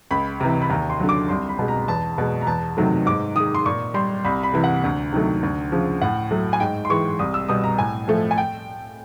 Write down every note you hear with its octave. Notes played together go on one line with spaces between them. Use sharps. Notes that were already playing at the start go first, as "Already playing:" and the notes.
C#2 B5
C3 E3 A#5
B5
D#2 A#5
C6
D3 F#3
D6
C2 C6
B5
B2 G#3
A#5
E2 A5
B2 G#3
A#5
E2 A5
C3 D#3 F#3 A3
G#2 D6
D#3 G#3 D#6
C6
A#2 C#6
G3 C6
C2 B5
B5
C3 E3
F#5
D2
C3 D#3 F#3 A3
D2
C#3 F3
A2 F#5
F#3 A3
G#5
G#2 G5
C6
E3 G#3 C#6
C2 D#6
E6
B2 G3 D#6
A#5
A2 G#5
F3 A3
G#5
G5